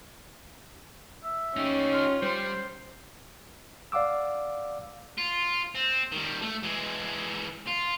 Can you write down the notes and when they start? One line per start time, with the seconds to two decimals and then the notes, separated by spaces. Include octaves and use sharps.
1.24 E5
1.57 C#4 D#4 G4
1.93 F4
2.23 G3 C5
3.92 D5 F5 F#5 D6 E6
5.18 F4
5.75 C4
6.12 D#3 G3
6.42 A3
6.63 E3 G#3
7.67 F4